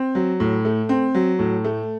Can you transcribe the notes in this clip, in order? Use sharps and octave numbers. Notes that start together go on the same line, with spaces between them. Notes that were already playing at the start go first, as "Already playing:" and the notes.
Already playing: C4
F#3
A2
A3
C4
F#3
A2
A3